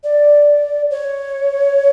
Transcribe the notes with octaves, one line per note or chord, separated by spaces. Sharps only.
D5
C#5